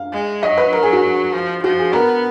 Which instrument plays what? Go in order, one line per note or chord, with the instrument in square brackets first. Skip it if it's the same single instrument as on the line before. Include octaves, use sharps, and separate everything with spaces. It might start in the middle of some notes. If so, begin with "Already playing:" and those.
Already playing: [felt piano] F5
[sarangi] G#3
[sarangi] F#3 [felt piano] D#5
[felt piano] B4
A#4
G#4
F#4
[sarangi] F3
[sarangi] F3 [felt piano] F#4
[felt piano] G#4
[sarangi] B3 [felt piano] A#4